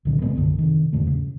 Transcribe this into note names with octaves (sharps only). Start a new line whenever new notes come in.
C2 A#2 D3 F#3
G#2 C3 A3 B3
B1 F#2 D3 D4
C3 D#3
E2 G#2 D3 A3
C#3